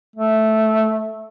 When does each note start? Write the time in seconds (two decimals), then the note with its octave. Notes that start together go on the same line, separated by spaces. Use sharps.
0.16 A3